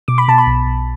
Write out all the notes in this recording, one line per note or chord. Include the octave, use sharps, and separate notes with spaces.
B2 D6
B5
B2 A5
B5
B1
B1